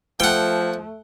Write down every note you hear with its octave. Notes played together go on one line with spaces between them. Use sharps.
F3 A3 F#5 G5